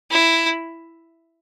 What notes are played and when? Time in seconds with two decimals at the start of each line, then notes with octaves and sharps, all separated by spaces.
0.11 E4